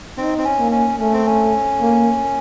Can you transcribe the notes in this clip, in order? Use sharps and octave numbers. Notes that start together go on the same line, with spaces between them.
C4 D#4
C4
C#4
A#3
C#4
A3 C#4
C4
C#4
A#3